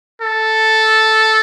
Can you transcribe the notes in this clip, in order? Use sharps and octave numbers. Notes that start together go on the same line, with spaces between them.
A4